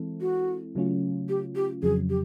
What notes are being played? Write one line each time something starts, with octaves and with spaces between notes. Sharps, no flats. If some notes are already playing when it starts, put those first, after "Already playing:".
Already playing: E3 G#3 C4 E4 A4
F#4
C#3 F#3 A3 C#4 F4
G4
G4
F2 C#3 F#3 G#4
G4